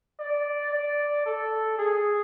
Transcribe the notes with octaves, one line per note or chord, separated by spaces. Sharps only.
D5
D5
A4
G#4